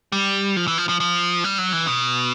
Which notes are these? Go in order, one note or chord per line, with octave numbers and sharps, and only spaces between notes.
G3
F3
E3
F3
F3
F3
G3
F#3
E3
B2